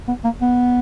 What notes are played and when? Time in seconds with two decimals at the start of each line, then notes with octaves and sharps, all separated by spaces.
0.08 B3
0.24 A#3
0.41 B3